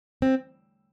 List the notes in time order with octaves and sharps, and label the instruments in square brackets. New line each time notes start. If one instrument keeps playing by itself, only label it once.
[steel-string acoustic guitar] C4